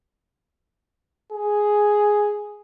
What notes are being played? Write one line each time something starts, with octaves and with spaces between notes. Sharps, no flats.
G#4